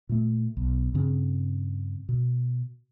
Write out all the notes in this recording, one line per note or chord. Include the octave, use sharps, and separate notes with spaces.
A#2 A3
B1
G2 C#3 C4
B2